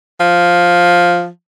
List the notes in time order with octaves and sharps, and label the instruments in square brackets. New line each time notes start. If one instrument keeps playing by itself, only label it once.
[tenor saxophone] F3